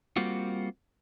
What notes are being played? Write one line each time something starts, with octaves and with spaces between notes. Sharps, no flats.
G3 A#3 C4 F4 F#4